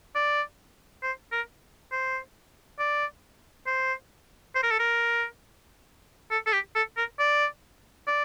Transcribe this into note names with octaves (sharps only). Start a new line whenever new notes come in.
D5
C5
A#4
C5
D5
C5
C5
A#4
A4
A#4
A4
A4
G4
A4
A#4
D5
D5